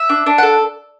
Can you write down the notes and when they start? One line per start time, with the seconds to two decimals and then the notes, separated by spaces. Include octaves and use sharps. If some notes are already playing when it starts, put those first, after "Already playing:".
Already playing: E5
0.09 D4
0.26 D4
0.38 F#5
0.43 A4